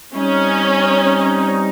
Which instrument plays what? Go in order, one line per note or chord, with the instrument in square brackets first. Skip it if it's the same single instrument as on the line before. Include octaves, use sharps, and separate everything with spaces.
[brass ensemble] G3 C4 D#4 [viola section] C#4